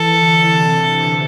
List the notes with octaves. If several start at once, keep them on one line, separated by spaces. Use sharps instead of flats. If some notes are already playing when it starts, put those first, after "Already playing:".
Already playing: E3 A4
D3
C3